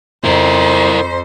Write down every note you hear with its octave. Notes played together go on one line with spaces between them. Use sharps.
F2 E4 A#4 C5